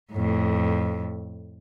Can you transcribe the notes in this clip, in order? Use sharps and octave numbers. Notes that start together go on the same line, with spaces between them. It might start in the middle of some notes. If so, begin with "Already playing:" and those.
F2 A2